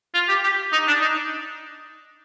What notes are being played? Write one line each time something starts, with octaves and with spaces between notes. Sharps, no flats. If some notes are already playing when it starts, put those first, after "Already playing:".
F4
G4
G4
D#4
D4
D#4